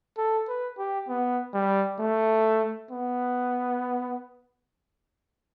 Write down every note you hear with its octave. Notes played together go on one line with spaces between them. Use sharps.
A4
B4
G4
B3
G3
A3
B3